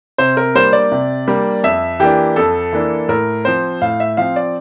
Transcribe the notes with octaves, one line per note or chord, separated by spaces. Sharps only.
C3 C5
A#4
G3 A#3 D4 C5
D5
C3
G3 A#3 D4
F2 E5
E3 A#3 D4 G4
F2 A4
E3 A#3 D4
A2 A#4
F3 C4 C5
A2 F5
E5
F3 C4 F5
D5